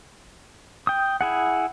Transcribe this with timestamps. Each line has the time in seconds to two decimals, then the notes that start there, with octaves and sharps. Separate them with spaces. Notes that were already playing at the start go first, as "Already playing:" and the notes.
0.87 G5 D#6
1.21 E4 G#4 F#5